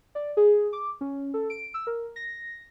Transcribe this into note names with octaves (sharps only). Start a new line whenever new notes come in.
D5
G#4
D6
C#4
A4
D7
E6
A#4
A#6